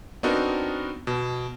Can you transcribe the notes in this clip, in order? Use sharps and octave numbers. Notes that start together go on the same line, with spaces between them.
B3 C4 D4 D#4 F#4 A#4
B2